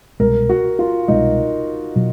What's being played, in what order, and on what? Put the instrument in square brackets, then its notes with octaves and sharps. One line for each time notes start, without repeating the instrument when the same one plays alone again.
[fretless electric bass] C2 B2 G#3 [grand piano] A#4
[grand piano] F#4
F4
[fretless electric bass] C2 B2 G#3 [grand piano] D#4
[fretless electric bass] B2 F#3